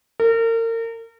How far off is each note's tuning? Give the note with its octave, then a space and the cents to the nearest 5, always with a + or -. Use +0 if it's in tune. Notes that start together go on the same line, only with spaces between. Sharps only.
A#4 -35